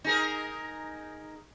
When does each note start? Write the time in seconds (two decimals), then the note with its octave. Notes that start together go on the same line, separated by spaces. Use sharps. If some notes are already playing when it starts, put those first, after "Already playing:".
0.04 D#4 G#4 A#4